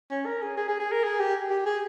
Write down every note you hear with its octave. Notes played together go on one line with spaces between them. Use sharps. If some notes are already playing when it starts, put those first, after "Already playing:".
C#4
A#4
G#4
G#4
G#4
G#4
A#4
G#4
G4
G4
G#4